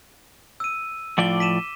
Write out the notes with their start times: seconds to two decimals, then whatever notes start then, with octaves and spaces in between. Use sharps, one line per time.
0.60 E6 D#7
1.18 A2 F3 D5 D6 G7
1.40 B6 D#7 E7